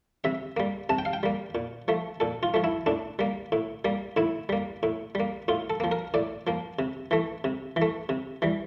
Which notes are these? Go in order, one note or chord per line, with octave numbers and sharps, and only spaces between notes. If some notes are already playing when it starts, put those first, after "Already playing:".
C3 E5
G3 A#3
C3 A5
G5
F5
G5
G3 A#3
A#2
F3 A3
A#2 A4
F4
F3 A3
E4
A2 D4
G3 A#3
A2
G3 A#3
A2 E4
G3 A#3
A2
G3 A#3
A2 F4
A4
F3 A#3
A#4
A2 D5
F3 A#3
C3
E3 A3
C3
E3
A3
C3
E3 G3